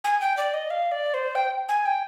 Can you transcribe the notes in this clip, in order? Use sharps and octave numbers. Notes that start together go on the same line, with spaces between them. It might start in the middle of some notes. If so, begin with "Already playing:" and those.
G#5
G5
D5
D#5
F5
D5
C5
G5
G#5
G5